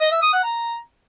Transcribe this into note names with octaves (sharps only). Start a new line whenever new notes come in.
D#5
E5
D#6
F#5
A#5